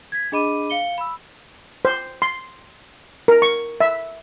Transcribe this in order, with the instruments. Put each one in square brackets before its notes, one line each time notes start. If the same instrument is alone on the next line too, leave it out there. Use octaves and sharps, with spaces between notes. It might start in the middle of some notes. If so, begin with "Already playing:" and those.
[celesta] G#6 B6
D4 G#4 D#5 B5 D6 D#7
F5 C#7 G7
B5 E6
[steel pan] C5
C6
A#4
C#6
E5